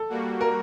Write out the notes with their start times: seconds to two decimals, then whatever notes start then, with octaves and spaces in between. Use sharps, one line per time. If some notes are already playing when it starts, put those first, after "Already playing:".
Already playing: A4
0.09 G3 A#3 F#4
0.41 A#4